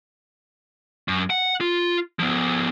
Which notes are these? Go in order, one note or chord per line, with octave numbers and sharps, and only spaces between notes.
F#2
F#5
F4
F3 B3